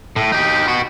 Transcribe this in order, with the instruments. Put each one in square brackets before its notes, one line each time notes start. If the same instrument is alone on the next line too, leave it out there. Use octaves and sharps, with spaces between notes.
[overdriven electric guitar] A2
D#4 G4
B3 F#4